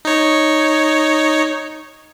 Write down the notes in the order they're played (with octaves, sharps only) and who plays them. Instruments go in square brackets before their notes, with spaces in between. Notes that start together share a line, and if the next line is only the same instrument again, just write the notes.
[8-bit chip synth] D#4 C#5